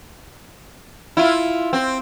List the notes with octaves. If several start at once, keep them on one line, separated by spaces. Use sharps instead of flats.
E4 F4
C4